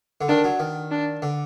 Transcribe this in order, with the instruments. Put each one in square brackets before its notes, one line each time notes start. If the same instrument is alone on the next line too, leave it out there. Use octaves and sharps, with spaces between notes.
[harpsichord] D3
[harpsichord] D#3 [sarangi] D4
[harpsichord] F#3
D#3
[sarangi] D4
[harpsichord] D3